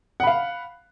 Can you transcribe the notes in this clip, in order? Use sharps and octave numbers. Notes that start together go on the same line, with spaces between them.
F5 F#5 B5